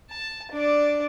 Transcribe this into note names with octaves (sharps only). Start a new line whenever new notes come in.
A5
D4 D5